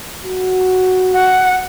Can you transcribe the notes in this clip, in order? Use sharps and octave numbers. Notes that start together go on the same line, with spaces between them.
F#4
F#5